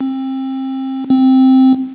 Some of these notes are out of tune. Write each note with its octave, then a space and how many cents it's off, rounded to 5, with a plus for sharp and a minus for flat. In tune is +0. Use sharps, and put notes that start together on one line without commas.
C4 +25
C4 +0